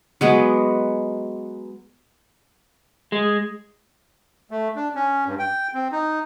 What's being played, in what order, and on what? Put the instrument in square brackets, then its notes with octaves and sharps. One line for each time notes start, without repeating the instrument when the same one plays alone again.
[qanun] F#3 G#3 B3
[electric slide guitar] G#3
[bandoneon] A3
D4
C#4
G2
G5
C4
D#4